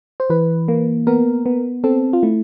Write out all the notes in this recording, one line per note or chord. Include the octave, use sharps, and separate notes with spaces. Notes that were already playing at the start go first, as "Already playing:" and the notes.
C5
E3 B4
A#3
B3 A#4
B3
C4 A4
F4
A3 E4